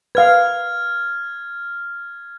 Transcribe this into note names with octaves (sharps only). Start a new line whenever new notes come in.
B4 F5 F6 G#6